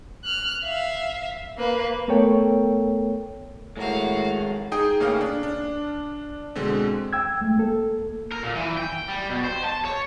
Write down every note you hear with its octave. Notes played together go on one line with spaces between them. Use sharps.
F6 F#6
E5 F5
A#3 B4
A3 B3 A4 A#4 C#5 G5
A2 G#3 F#4 A#4 F5
D#4 G#4 G5 D#6
A2 C#3 A#3 C#4 F5 F6
D4
D4
B2 D3 G#3 C4
G5 E6 G#6
G#3 A3
A#3 A4
A#4
A#2
E3
G5
G3
B2
C5
A5
C#5